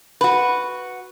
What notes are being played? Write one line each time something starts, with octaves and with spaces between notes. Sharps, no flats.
F#4 B4